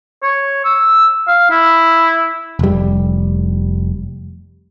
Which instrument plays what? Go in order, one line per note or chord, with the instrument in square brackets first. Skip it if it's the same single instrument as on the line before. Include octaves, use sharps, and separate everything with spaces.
[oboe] C#5
E6
F5
E4
[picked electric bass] F1 G3